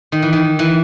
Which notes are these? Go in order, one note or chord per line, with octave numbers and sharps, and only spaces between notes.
D#3
E3
D#3
E3